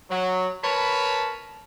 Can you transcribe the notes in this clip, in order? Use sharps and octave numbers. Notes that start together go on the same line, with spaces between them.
F#3
A#4 B4 C#5 A5 B5